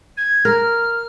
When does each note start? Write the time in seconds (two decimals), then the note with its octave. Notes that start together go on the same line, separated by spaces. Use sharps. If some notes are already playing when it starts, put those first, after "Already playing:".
0.17 G#6
0.45 A#4 F6